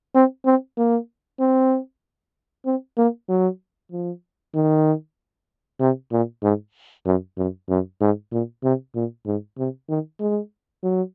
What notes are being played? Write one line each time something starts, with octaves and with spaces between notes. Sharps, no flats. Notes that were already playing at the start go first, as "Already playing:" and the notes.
C4
C4
A#3
C4
C4
A#3
F#3
F3
D#3
C3
A#2
G#2
F#2
F#2
F#2
G#2
A#2
C3
A#2
G#2
C3
D#3
G#3
F#3